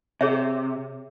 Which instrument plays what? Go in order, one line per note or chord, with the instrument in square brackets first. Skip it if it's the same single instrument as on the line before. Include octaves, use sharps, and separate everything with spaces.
[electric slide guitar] C3 [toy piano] G#4 C#5 E5